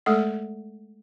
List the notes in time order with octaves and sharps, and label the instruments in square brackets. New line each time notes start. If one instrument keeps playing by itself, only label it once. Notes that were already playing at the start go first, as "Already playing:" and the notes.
[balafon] G#3 A3 A4 F#5